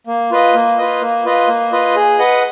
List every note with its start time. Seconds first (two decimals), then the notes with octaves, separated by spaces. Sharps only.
0.07 A#3
0.31 F4 B4 D#5
0.54 A#3
0.78 F4 B4 D#5
1.01 A#3
1.25 F4 B4 D#5
1.48 A#3
1.72 F4 B4 D#5
1.96 G#4
2.19 B4 D#5 F#5